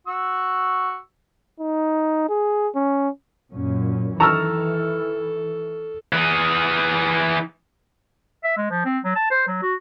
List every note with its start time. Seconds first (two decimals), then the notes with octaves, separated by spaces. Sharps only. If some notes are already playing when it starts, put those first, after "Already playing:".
0.07 F#4 C#6 E6
1.60 D#4
2.29 G#4
2.75 C#4
3.52 F#2 A#2 C#4
4.20 D#3 E3 A4 A5 A#5 C#6 E6 F6
6.13 E3 G#4
8.44 E5
8.57 G#3
8.71 F3
8.85 C4
9.05 F#3
9.16 A5
9.31 C5
9.48 F#3
9.62 F#4